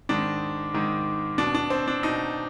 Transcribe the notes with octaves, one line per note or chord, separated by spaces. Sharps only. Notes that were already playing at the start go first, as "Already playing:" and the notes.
G#2 D#3 D4
G#2 D#3
B2 D4
D4
C4
D4
B2 D#4